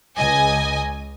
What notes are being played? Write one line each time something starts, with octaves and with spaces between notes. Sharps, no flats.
C#2 D#5 G#5